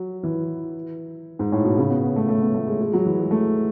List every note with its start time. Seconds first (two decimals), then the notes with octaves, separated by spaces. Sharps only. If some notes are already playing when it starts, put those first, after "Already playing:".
Already playing: F#3
0.23 E3
1.39 G#2
1.52 A2
1.64 B2
1.78 C#3
1.90 B3
2.03 B3
2.16 A3
2.28 A3
2.41 B3
2.54 A3
2.67 G#3
2.80 G#3
2.93 F#3
3.05 E3
3.19 G#3
3.31 A3